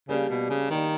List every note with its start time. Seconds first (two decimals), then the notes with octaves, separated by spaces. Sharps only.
0.09 C#3 G3 A#3 D4 G4
0.30 B2
0.50 C#3
0.70 D#3 G3 A#3 D4 G4